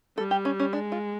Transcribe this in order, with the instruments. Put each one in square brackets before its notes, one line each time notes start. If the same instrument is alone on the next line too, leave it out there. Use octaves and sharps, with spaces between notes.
[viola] G3 [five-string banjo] A4
[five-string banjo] G4
C#4
C#4
[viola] G#3 [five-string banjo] D4
[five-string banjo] F4